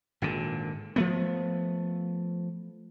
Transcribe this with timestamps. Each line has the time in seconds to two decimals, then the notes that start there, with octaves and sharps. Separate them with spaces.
0.22 G#1 A#2 D3
0.96 F3 A3 B3